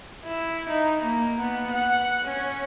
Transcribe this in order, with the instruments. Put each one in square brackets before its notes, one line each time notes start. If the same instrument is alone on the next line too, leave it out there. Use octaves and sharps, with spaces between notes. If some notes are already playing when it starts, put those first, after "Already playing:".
[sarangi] E4
D#4
A#3
B3
F#5
C#4